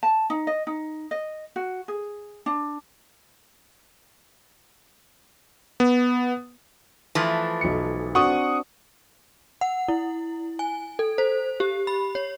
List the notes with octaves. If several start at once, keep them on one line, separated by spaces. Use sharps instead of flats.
A5
D#4
D#5
D#4
D#5
F#4
G#4
D4
B3
E3 F3 A3
B1 C#7
C4 D4 F#4 F#5 C#6 D#6
F#5
E4
G#5
A4
C5
G4
B5
C#5